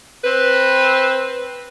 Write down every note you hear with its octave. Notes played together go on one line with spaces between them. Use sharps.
C4 B4